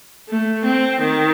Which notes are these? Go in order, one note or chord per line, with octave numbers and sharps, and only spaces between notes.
A3
C4
D#3